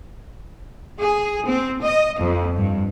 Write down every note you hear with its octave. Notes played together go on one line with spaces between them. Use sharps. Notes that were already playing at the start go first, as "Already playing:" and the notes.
G#4
C4
D#5
F2
G2